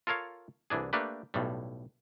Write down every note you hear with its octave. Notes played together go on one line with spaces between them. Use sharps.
F4 A4 A#4 C#5 F5
C2 E3 D4 G#4
A3 A#3 D4 G4 B4
B1 A2 G3